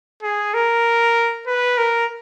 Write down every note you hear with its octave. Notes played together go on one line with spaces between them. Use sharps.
G#4
A#4
B4
A#4